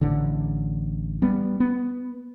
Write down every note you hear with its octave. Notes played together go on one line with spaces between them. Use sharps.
A1 D3
G3 B3
B3